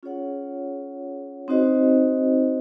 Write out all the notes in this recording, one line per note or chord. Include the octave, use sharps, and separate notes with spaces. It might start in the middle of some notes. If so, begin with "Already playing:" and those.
C#4 F4 G#4 C#5 F#5
C4 D#4 F#4 C5 D#5